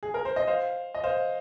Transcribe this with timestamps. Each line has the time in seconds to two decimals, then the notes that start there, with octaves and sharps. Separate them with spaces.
0.03 G#4
0.14 A#4
0.25 C5
0.36 D#5
0.47 C5 F5
0.95 D#5
1.04 C5 F5